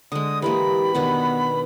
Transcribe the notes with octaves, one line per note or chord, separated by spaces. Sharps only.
D3 G#3 D#6
E3 G#3 A#3 G4 B5
B2 D#3 B3 D4